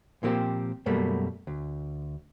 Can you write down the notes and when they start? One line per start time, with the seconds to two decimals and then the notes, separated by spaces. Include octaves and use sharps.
0.23 A#2 F3 A#3 C4 G4
0.86 F#2 B2 G3 A3 A#3
1.47 D2